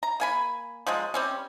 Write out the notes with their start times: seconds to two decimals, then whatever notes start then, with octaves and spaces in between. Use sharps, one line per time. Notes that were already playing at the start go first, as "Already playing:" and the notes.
0.03 A#5
0.20 A#3 G#5 B5
0.87 F3 F#3 G#3
1.14 G3 C4 C#4